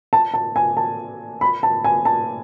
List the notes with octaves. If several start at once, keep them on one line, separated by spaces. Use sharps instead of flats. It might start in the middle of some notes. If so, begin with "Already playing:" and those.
A5
A5
G#5
A5
B5
A5
G#5
A5